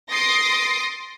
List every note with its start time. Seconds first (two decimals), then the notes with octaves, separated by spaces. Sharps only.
0.11 C6 D#6 A6 A#6 C7 D7